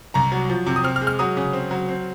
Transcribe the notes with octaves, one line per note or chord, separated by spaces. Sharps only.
C2 A#5
F#3
F3
C3
D#6
C4 F6
F6
G#3
F6
F#3 D#6
C#3
C4
F#3
C4